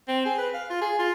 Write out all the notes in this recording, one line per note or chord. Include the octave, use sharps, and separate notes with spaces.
C4
G#4
B4
F5
F4
G#4
F4